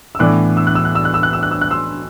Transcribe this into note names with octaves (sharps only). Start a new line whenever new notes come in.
E6
A2 E3 B3 D4 D6 F#6
E6
F#6
E6
F#6
E6
F#6
E6
F#6
E6
F#6
E6
F#6
C6 E6